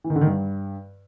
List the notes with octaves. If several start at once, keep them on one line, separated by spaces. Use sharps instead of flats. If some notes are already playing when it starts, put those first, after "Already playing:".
E3
D#3
D3
D#3
G2